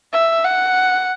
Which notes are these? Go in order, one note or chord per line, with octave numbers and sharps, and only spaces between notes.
E5
F#5